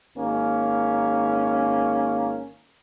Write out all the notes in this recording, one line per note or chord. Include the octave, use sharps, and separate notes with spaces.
G#1 A#3 C#4